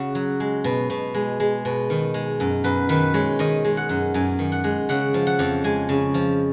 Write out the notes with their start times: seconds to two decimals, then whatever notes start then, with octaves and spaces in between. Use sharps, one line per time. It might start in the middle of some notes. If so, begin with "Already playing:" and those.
Already playing: C#3 F#4
0.15 F#3
0.40 G#3
0.64 B2
0.90 B2
1.14 G#3
1.40 G#3
1.65 B2
1.90 D#3
2.14 G#3
2.40 F#2
2.64 F#2 B4
2.89 D#3 B4
3.14 G#3 C#5
3.39 D#3 D#5
3.65 G#3
3.77 F#5
3.89 F#2
4.14 F#2 G#5
4.39 D#3
4.52 F#5
4.64 G#3
4.89 C#3 F#5
5.14 F3
5.27 F#5
5.39 F2
5.64 G#3 G#5
5.89 C#3
6.14 F3